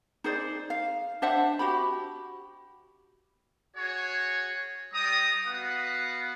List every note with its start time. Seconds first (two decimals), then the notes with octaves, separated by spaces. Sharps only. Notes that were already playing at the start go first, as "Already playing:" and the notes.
0.24 D#4 G#4 C5 D5
0.70 F5
1.22 D4 C5 E5 F#5
1.59 F#4 G4 B5
3.76 F#4 G#4 C#5
4.93 G3 G5 A#5 D#6
5.45 B3 F#4 B4 F5 F#5